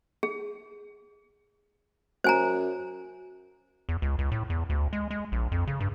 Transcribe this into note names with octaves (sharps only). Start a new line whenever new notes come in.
G#4
F#2 C5 G#5 A#5
E2
C#2
C#2
A2
E2
D2
G#3
G#3
A#1
F2
C#3
G2